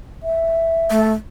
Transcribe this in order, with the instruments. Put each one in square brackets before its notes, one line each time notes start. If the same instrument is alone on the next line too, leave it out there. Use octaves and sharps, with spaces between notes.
[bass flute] E5
[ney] A3